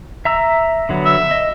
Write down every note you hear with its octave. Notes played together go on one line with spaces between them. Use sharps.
E5 A#5 E6
D3 F#3 B3
E5
D#5